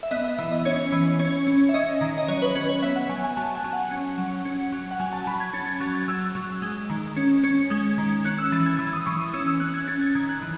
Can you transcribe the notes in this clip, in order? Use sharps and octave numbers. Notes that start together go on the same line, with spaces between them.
E5
B3 D#5
E5
E3 E5
D#5
C#4 C#5
E3
C#4 C#5
C#4
E5
C#4 D#5
D#3
D#5
F#3 C#5
B4
C#4 B4
C#5
B3 E5
F#5
F#3 G#5
G#5
F#3 A5
G#5
F#3
F#5
C#4
F#3
C#4
F#3
F#5
F#3 G#5
A5
F#3 B5
G#6
C#4 A6
G#6
F#3 A6
G#6
F#3 E6
F#3
G#3
D#3
C#4
C#4
G#3 G#6
D#3
C#4 F#6
E6
E3 A6
G#6
E3 E6
D#6
E3 C#6
D#6
C#4 E6
E6
C#4 F#6
G#6
C#4 A6
G#6
D#3 G#6
F#6
E3